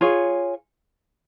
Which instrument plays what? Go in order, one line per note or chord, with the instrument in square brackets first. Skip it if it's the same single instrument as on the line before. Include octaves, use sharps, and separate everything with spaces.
[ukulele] F4 G#4 C#5